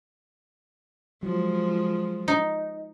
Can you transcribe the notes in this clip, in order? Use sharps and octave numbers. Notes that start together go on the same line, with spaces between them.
F3 F#3 G#3
D#4